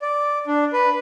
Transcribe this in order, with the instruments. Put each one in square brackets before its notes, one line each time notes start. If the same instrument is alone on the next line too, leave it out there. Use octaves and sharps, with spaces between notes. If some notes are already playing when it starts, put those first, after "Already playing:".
[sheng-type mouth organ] D5
D4
B4